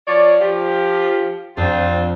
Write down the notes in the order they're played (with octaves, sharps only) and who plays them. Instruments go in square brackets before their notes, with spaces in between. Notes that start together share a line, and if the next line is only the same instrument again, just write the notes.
[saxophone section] F3 C#5 D5
F3 G4
[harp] F2 [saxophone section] C4 D4 F4